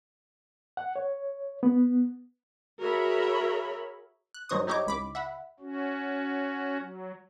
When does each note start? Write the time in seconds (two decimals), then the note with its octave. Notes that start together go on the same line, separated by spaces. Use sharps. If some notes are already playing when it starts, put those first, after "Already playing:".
0.77 F#5
0.96 C#5
1.63 B3
2.79 F#4 G#4 A#4 C#5 E5 B5
4.34 F#6
4.49 G2 F#3 D#4 C5 C#6 D#6
4.67 D#4 E4 G4 C#5 D#5 D6
4.87 C#2 B5 D6
5.15 E5 F#5 B5
5.60 C#4 F#4
6.79 F#3